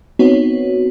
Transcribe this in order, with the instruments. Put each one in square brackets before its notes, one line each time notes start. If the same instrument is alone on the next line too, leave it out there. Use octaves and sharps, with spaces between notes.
[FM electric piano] B3 C4 D#4 F#4 C#5